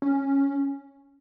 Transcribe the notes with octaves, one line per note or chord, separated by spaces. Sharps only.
C#4